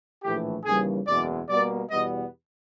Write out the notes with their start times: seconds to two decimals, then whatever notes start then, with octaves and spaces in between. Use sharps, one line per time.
0.23 A#1 A2 E3 A3 G4
0.65 D#2 C#3 E3 G3 G#4
1.07 F#1 E2 B2 G#3 D5
1.49 B2 G3 A#3 D5
1.91 E2 B2 G3 B3 D#5